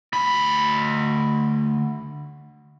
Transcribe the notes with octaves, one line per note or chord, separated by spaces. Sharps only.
D2 B5